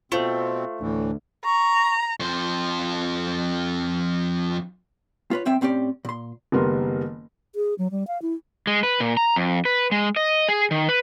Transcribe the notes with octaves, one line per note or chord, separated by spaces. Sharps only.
B2 A3 C4 F4 C5
D2 A2 E3
A#5 C#6
F2 C5
F4 B4 C#5
B1 C4 E5 G5
A2 C4 C#4 G4 D5
A#2 C6
F#1 D#3 G3 B3 A#4 C6
G#4
F#3
G3
F5
E4
G#3
B4
A#2
A#5
F2
B4
G#3
D#5
G#4
D#3
B4